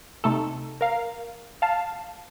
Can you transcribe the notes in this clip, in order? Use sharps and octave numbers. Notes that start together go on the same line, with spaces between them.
C3 A3 D#4 A4
A#4 F5
F5 A5